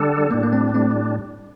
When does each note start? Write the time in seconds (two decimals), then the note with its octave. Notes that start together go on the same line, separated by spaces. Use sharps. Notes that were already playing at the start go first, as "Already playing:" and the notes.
Already playing: D3 G3 D4 A4
0.30 A2 G3 A#3 D4
0.43 A#3
0.53 A3 C4
0.74 A3 C4